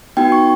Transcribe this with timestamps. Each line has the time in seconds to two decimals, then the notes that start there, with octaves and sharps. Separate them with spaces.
0.17 B3 D#4 F#4 G5
0.32 C#6